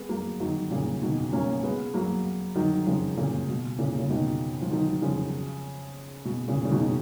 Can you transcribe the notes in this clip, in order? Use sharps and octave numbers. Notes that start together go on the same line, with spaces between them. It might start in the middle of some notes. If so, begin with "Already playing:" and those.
Already playing: G#3 B3
F#3 A#3
D#3 F#3
A#2 C#3
B2 D#3
A#3 C#4
G#3 B3
F#3 A#3
D#3 F#3
C#3 F3
A#2 C#3
B2
A#2 C#3
C#3
B2 D#3
F3
D#3 F#3
C#3 F3
B2
A#2 C#3
C#3
B2 D#3